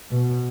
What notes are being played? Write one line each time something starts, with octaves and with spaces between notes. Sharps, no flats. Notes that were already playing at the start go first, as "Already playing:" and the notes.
B2